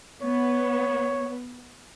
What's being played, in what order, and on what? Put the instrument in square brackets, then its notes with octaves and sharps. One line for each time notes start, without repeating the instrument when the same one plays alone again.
[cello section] B3 [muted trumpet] C#5